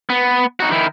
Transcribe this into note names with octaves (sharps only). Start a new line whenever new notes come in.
B3
D#4 F#4
D#3 E4